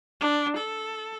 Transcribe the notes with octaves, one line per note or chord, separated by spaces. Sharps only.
D4
A4